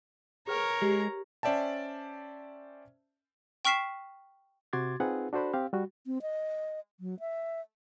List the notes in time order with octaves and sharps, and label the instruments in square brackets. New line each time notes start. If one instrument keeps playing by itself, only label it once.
[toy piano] G#4 B4 G5 [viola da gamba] A#4 C#5 [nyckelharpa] A#5
[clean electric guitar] G#3 [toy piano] G4
[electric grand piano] C#4 C5 D5 E5 G5 A5
[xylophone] G5 C#6 F6 B6 C7 E7
[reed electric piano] C3 F#4 C6 D6 G#6 A6
C4 D#4 F4 G#4 B4 F#5
D4 F#4 A4 C5 D5 B5
C4 G4 F5
G3 F#4
[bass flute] C4
D#5
F#3
E5